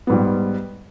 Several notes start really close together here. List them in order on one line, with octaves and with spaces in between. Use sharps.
B3 G#2 G3